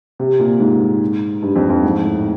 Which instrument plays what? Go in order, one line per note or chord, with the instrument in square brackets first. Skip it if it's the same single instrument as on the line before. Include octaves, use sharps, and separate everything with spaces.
[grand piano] C3
A#2
G#2
G2
F2
F2
G#2
A2